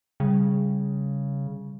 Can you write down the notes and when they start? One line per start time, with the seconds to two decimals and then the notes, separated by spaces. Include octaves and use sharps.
0.20 C#3 G3